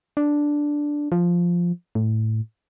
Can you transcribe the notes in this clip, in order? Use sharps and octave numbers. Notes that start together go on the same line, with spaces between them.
D4
F3
A2